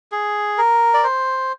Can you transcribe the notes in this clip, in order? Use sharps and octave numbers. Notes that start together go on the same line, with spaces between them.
G#4
A#4
D5
C5